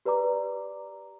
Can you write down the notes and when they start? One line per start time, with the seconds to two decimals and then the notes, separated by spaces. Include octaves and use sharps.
0.05 G4 B4 D5 A#5 D6